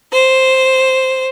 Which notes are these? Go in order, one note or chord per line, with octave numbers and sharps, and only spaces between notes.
C5